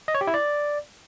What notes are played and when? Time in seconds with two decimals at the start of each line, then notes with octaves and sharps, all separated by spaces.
0.08 D#5
0.15 C#5
0.21 G4
0.27 E4
0.34 D5